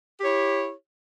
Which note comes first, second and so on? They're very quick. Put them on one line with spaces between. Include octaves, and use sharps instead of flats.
G4 C#5 E4